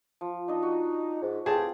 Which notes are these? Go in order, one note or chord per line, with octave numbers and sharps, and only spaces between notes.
F3
D4 D#4 D#5
F#4
G#2
E2 A2 C4 F4 G4 G#4 A5